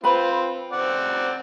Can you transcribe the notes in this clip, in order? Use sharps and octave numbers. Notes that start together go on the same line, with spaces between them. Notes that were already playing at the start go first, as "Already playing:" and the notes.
C4 F4 B4 B5
C4 D5 F#5